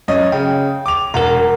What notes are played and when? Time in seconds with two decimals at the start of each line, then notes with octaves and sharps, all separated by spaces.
0.08 F#2 C#4 D#5
0.32 C#3 G5
0.86 D6 F7
1.14 E1 A#4 F#5 A#5